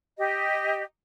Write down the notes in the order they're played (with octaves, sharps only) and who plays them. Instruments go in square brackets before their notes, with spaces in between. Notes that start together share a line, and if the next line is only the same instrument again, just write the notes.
[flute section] G4 D#5